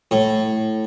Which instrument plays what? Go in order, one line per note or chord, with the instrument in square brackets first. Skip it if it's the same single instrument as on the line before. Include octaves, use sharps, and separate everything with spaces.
[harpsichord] A2